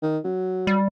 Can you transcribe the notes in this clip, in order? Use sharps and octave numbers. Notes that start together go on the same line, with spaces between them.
D#3
F#3
G3